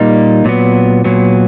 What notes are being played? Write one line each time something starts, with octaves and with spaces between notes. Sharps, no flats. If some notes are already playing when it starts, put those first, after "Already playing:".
Already playing: A#2 G3 A#3 D#4
A#2 F#3 B3
A#2 F#3 B3